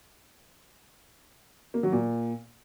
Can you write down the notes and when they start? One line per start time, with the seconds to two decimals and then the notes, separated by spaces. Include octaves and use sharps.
1.74 A#3
1.83 F#3
1.92 A#2